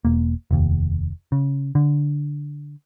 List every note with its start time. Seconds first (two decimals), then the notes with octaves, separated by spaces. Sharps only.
0.05 E1 A#3
0.51 F1 D#2
1.32 C#3
1.75 D3